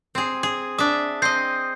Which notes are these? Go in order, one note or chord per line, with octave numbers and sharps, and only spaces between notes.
C4 G#4
G#4
D4 E5 D#6
C4 D#5 G6 C7